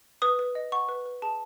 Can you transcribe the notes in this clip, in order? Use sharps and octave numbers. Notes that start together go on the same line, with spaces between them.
B4 D#6
B4
D#5
F#5 C#6
B4
B4
G#4 A5